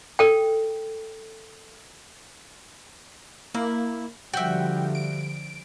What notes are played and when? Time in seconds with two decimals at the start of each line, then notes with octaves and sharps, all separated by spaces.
0.19 A4 G5
3.55 A#3 E4
4.34 D3 F3 G3 F#4 E5 G5
4.95 D7